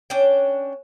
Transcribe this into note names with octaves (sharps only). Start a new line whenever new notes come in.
C#4 D4 G5